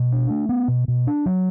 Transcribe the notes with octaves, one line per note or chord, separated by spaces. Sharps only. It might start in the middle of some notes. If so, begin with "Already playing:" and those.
Already playing: B2
D4
A3
B3
B2
B2
D4
F#3